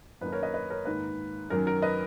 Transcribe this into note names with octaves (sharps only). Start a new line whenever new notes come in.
F#2 D#3 A#3 D#4 B4
A#4 C#5
B4 D#5
B4 D#5
A#4 C#5
G#2 D#3 A#3 B4
F#2 D#3 F#3 C#4 A#4
A#4
B4 D#5